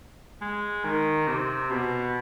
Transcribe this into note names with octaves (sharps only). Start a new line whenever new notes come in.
G#3
D#3
C3
B2